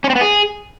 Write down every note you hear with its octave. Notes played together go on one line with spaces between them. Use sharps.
C#4
C4
B3
G#4